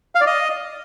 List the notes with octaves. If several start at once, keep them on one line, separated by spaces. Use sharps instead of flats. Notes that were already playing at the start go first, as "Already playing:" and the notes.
F5
D5
D#5